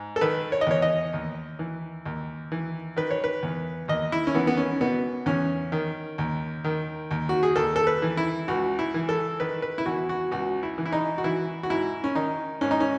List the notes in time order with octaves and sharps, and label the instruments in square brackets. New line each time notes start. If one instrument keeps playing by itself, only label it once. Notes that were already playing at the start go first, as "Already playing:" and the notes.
Already playing: [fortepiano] G#2
A4
D#3 B4
C#5
D#5
E2 C#5
D#5
D#2
E3
D#2
E3
D#3 B4
C#5
B4
E2
D#2 D#5
E4
C#4
E3 B3
B3
C#4
B2 B3
E2 C#4
D#3
D#2
D#3
D#2
F#4
G#4
D#2 A4
A4
B4
E3
E4
C#2 F#4
E4
E3
A4
D#3 B4
B4
E4
E2 F#4
F#4
C#2 F#4
E4
E3
E4
D#4
F#4
E3 E4
F#4
G#2 E4
C#4
D#3 D#4
G#2 C#4
D#4
C#4